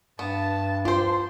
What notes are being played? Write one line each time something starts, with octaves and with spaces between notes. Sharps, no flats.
G2 B3 A5
F4 G4 C5 C6